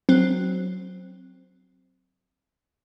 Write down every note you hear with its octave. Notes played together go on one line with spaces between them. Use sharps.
F#3 C4